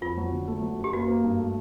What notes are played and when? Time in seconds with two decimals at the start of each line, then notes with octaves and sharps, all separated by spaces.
0.01 F2 F4
0.17 F#3
0.32 D3
0.48 A3
0.62 F#3
0.78 F#2
0.84 G4
0.93 A#3 F#4
1.08 A#3
1.24 G2
1.39 A3